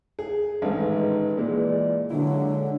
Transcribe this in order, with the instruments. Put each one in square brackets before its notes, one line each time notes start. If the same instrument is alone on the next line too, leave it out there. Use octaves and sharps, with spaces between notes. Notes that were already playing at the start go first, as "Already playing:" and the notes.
[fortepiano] G#4
[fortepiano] A1 G#2 A3 [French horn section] D#3 D#4 B4
[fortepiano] A#2 G#3 [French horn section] E3 D5
[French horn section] A#2 F#3 G#3 [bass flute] D3 [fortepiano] E4